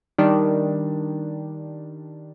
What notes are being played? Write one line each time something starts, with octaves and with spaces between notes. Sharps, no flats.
D#3 G3 D4